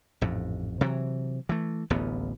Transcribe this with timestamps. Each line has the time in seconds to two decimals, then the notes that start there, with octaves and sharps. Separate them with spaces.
0.21 A1 F2 G#2
0.81 C3 E3 F#3
1.49 E3 A3
1.90 D1 A1 D#2 B3